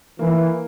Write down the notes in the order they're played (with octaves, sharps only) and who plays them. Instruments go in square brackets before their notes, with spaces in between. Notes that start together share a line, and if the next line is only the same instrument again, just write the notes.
[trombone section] E3 [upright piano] A#3